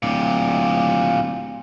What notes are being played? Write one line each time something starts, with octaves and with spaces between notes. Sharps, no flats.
D1 A#2 G4